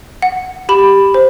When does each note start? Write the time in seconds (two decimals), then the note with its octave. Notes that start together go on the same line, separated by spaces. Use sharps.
0.22 F#5
0.69 G4 B5
1.14 C5